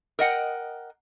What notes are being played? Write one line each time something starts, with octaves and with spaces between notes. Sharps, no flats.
A#4 D#5 F#5 G5